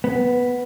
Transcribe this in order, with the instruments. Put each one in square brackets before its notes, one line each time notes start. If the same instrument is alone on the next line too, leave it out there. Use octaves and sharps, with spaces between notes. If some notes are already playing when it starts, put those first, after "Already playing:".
[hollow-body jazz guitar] B3